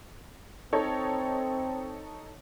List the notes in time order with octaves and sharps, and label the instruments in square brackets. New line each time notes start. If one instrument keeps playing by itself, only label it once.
[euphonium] C4 [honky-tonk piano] D#4 A4 C#5